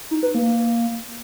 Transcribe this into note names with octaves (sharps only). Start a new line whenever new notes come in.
D#4
B4
A#3